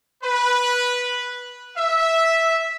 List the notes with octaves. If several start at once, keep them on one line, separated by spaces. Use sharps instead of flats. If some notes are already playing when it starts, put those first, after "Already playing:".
B4
E5